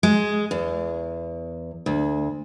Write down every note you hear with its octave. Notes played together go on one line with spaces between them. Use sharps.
G#3
E2
D2